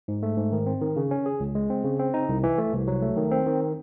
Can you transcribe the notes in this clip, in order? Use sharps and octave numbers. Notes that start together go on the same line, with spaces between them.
G#2
A3
G#2
D#3
C4
D#3
C#3
C#4
G#4
C#2
G#3
C4
C#3
C4
D#4
C2
E3
A3
C2
F#3
A3
D#3
C4
D#3